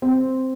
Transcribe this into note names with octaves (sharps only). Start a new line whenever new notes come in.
C4